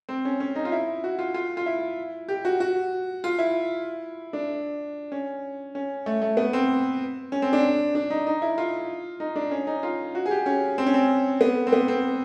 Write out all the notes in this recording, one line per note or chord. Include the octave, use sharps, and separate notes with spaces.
C4
C#4
C#4
D#4
F4
E4
F#4
F4
F4
F4
E4
G4
F#4
F#4
F4
E4
D4
C#4
C#4
A3
A3
B3
C4
C#4
C4
D4
D4
D#4
D#4
E4
F4
D#4
D4
C#4
D#4
F4
F#4
G#4
G4
C#4
C4
C#4
C4
B3
C4
B3
C4